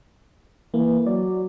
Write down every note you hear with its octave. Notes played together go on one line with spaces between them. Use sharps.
E3 A#3
F#3 D5